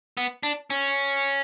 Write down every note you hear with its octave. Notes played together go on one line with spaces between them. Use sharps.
B3
D4
C#4